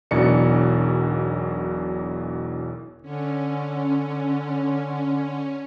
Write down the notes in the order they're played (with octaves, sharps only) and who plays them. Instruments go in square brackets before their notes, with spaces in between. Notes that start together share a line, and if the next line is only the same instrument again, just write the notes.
[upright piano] E1 B1 B2 E3 D4 C#7
[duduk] D3 [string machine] C#4